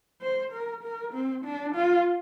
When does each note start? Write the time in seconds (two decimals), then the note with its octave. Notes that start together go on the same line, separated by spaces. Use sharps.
0.22 C5
0.52 A#4
0.83 A#4
1.14 C4
1.45 D4
1.75 F4